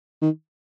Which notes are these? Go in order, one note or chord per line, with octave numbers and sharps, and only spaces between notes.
D#3